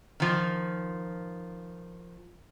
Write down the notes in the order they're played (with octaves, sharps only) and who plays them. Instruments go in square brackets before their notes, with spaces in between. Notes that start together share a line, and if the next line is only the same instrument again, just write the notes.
[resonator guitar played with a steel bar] D#3 F3